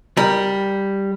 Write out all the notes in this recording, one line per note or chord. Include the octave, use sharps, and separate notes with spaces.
G3 A#4